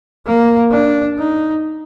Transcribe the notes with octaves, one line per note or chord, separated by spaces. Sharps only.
A#3
D4
D#4